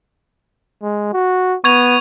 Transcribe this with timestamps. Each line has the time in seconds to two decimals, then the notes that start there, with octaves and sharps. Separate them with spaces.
0.83 G#3
1.13 F#4
1.64 B3 C#6 G#6 F7